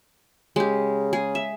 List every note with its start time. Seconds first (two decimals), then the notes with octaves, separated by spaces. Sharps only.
0.56 C#3 G#3 G4
1.13 G#4
1.35 E5